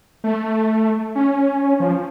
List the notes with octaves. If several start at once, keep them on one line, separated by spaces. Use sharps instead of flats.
A3
C#4
F3